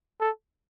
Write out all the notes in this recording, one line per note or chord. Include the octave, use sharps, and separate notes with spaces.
A4